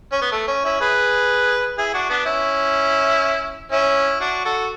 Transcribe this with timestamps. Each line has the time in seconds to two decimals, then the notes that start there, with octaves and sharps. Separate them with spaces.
0.12 C#4
0.22 B3
0.32 A3
0.48 C#4
0.64 C#4 E4
0.80 G#4 B4
1.78 E4 G#4
1.94 D4 F#4
2.09 B3 D4
2.26 C#4 E4
3.72 C#4 E4
4.21 D4 F#4
4.45 F#4 A4